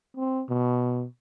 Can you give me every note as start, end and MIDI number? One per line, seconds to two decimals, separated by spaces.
0.17 0.44 60
0.49 1.05 47